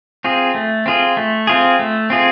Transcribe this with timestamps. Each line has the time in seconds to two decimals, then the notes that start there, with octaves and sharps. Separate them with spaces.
0.24 C4 F4 G#4
0.55 A3
0.86 C4 F4 G#4
1.17 A3
1.47 C4 F4 G#4
1.79 A3
2.10 C4 F4 G#4